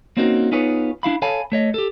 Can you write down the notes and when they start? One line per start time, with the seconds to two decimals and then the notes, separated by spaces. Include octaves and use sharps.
0.17 A#3 C4 C#4 D#4 F#4 A#4
0.52 B3 D#4 F4 G#4 B4 C#5
1.03 D4 E4 F5 B5
1.22 A4 C#5 F5 G#5 A5 B5
1.52 A3 C#5 D#5
1.74 G4 A4